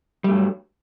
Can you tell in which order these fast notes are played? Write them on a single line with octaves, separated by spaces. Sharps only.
G3 A3 G2 F#3